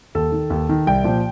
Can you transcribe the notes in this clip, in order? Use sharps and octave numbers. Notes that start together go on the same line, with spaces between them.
D#2 A4
D#3
D#2
D#3
C2 G5
A#2 F3